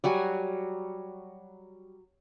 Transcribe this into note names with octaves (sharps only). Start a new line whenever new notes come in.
F#3 G3 F#4 G#5